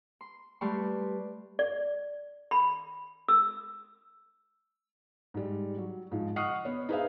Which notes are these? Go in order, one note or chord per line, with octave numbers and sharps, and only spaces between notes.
C6
G3 A3 G4 B4 C6 C#6
D5
B5
E6
G#2 G3
F#3
G#2 F3
D#5 F#5 C#6 D#6 F6 C7
B3 C#5
D#4 G#4 B4 C5 E5 F5